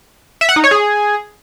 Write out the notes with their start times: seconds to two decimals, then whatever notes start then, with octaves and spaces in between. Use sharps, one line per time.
0.41 E5
0.49 F#5
0.56 D#4
0.64 C#5
0.71 G#4